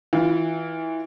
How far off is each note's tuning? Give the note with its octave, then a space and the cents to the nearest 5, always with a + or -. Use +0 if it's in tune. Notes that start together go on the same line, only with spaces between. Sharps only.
E3 -20 F4 +0